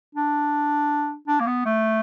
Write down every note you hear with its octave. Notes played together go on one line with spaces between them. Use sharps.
D4
D4
A#3
B3
A3